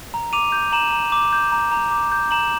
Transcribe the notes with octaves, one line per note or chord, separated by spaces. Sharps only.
A#5
D6 D#7 F7
G6
A#5 E7 F#7
A#5
D6
G6
A#5
A#5
D6
G6
A#5 E7 F#7